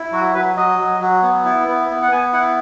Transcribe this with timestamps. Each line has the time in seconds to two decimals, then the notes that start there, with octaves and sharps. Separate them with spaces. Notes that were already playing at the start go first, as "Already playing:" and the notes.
Already playing: E4
0.12 F#3 F#4
0.34 F#3 B4
0.56 F#3 D#5
0.79 F#3
1.00 F#3
1.22 B3
1.45 E4
1.67 B3
1.90 B3
2.02 F#5
2.12 B3 G#5
2.33 E4 F#5